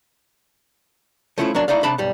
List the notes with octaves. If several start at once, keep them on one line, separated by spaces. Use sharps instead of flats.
F3 A3 B3 C#4 E4 F4
F#3 A#3 D4
A3 D#4 E4 D5 F5
C3 D4 A5 B5
B1 G2 G3